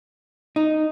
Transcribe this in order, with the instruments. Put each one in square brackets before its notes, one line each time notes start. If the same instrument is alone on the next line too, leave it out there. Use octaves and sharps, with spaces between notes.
[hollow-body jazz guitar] D#4